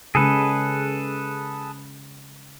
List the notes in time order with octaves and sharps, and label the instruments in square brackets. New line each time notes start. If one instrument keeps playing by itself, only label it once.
[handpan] C#3 G#3 [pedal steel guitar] G#4 A4 B4